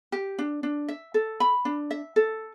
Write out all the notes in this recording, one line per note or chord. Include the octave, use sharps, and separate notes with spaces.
G4
D4
D4
E5
A4
B5
D4
E5
A4